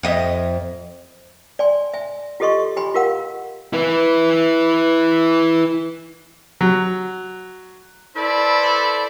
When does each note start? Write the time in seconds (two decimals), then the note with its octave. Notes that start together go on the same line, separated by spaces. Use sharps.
0.03 F2 D#5 E5
1.59 D5 G#5 C6
1.94 E5 G#5
2.40 F4 G4 A4 D#5 C6 C#6
2.76 G4 G#5 B5 C6
2.94 F4 G4 A#4 F5 F#5
3.73 E4 B4
6.61 F#3
8.16 E4 A4 B4 C5 D5